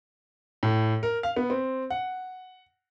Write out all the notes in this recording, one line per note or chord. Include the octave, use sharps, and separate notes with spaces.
A2
A#4
F5
B3
C4
F#5